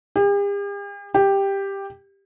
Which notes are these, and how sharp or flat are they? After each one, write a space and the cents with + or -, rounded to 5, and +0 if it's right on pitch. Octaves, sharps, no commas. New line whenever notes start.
G4 +45
G4 +5